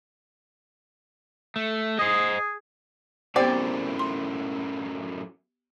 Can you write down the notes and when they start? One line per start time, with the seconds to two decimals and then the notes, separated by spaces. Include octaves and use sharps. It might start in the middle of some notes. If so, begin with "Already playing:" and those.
1.56 A3
1.99 G#4 C5 D#5
3.36 F#2 A2 B3 C4 G4 D5
3.99 C6